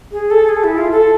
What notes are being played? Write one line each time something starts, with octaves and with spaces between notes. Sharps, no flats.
G#4
A4
G#4
E4
F4
A4